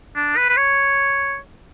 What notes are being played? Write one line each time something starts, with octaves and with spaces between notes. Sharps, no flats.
D4
B4
B4
C#5